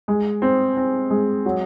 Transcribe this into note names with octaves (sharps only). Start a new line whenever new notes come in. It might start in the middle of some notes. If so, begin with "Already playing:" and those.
G#3
C4
C4
G#3
F#3